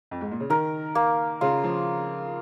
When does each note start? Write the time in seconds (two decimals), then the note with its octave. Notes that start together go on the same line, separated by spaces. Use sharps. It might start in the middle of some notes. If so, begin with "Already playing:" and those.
0.11 F2
0.21 G#2
0.31 A#2
0.40 C#3
0.50 D#3 A#4
0.95 A#3
1.41 C#3 F4
1.64 F3